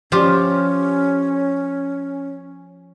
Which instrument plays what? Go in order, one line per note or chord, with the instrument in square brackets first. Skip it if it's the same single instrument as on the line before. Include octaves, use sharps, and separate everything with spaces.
[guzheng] F3 F4 G4 [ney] C#4